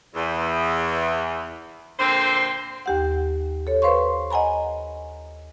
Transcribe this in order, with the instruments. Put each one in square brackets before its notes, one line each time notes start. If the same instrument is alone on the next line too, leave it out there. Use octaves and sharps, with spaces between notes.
[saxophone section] E2
A#2 D3 C4 C5
[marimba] D#2 G4 F#5
A4 C#5
B4 C5 F5 C6 C#6
D#5 F#5 G#5 A#5 B5